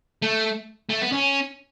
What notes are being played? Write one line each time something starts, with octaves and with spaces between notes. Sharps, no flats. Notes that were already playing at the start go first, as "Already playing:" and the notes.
A3
A3
B3
C#4